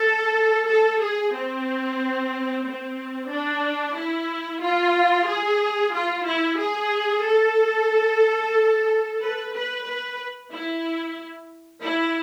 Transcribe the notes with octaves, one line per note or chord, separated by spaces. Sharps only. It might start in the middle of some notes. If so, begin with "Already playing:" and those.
Already playing: A4
A4
G#4
C4
C4
D4
E4
F4
G#4
F4
E4
G#4
A4
B4
B4
B4
E4
E4